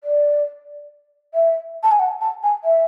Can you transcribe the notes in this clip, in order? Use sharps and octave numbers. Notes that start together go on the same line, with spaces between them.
D5
E5
A5
G#5
F#5
A5
G#5
E5